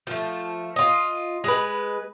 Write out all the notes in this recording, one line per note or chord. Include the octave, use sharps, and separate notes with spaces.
F3 A3
F4 D#5
G#3 B4